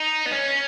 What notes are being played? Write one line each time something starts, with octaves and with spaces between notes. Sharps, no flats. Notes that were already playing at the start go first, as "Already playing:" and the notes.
Already playing: D#4
B3
C#4